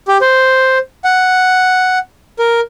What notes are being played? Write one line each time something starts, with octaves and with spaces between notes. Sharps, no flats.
G4
C5
F#5
A#4